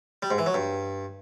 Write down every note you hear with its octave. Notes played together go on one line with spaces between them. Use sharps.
G3
G#2
E3
F#3
G2